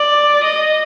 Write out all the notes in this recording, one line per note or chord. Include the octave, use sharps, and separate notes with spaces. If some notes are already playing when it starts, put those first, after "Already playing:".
Already playing: D5
D#5